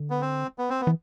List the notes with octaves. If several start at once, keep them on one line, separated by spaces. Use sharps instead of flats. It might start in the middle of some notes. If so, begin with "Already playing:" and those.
Already playing: D3
B3
C4
B3
C4
B3
E3